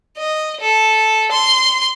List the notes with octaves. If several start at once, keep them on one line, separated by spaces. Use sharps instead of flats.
D#5
A4
C6